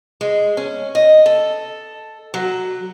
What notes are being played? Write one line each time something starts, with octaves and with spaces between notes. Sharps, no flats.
G#3
C#4
D#5
A4
F#3